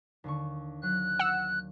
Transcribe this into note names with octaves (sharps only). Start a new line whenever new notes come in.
D#2 D3 C#6
F#3 F#6
F#5 E6